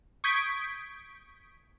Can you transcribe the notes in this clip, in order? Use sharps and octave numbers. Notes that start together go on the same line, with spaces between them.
C#6 D#6 G6 G#6 B6 D7